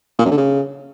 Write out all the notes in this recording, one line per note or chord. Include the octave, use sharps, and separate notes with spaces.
A#2
F#2
D3
C#3